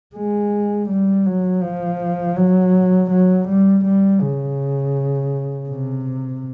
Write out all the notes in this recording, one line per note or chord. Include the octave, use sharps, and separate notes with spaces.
G#3
G3
F#3
F3
F#3
F#3
G3
G3
C#3
C3